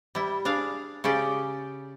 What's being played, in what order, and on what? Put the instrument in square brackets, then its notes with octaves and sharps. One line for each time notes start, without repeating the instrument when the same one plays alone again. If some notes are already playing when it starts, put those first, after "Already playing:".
[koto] G3 E4
D4 G#4 F5
C#3 C#4 G4 D5